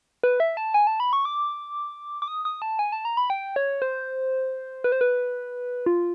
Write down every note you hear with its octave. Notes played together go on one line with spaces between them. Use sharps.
B4
E5
A5
G#5
A5
B5
C#6
D6
D6
D#6
D#6
A5
G#5
A5
A#5
B5
G5
C#5
C5
B4
C5
B4
F4